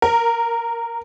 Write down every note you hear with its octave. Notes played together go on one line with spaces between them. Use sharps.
A#4